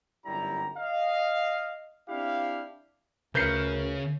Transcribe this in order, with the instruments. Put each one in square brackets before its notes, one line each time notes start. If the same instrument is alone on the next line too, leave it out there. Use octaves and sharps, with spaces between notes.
[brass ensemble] G1 F#2 G3 E4 G4 A#5
D#5 F5
C4 D4 E4 G4 F5
[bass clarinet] D2 [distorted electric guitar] C#3 [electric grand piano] A#4 B4 [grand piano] G6 C7 C#7